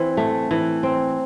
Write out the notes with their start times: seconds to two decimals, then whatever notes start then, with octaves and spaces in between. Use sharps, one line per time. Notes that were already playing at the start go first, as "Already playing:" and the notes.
Already playing: E3 C4
0.17 A3
0.51 E3
0.83 C4